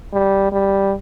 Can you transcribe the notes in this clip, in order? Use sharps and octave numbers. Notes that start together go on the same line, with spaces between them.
G3
G3